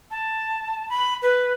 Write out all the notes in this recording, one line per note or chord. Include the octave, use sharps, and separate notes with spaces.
A5
B5
B4